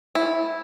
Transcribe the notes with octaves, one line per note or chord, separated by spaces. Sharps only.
E4